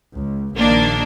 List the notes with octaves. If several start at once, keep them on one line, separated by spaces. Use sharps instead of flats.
C#2
A#1 D#3 A#3 D4